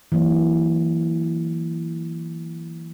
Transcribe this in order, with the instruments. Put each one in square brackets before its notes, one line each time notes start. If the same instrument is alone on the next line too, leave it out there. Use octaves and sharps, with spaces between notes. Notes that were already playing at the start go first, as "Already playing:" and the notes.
[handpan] E3 F#3 A#3